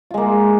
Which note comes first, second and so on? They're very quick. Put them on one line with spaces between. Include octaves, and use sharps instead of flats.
F4 G#3 A#3